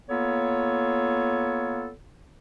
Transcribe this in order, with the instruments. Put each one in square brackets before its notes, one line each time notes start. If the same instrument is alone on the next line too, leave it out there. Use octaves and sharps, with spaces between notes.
[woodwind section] A#3 B3 F4 A4 C#5